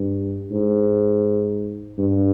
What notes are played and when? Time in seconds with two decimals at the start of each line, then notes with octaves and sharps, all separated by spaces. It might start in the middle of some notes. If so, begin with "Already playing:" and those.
Already playing: G2
0.51 G#2
1.99 G2